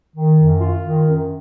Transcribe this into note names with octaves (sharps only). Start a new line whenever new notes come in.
D#3
F#2
F4
D#3
F#2